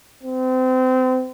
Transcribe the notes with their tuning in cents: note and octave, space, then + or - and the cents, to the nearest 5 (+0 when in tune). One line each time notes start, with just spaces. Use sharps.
C4 -30